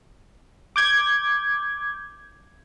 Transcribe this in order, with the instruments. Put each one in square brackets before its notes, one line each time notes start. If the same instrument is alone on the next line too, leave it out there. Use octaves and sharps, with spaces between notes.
[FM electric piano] D6 G6 G#6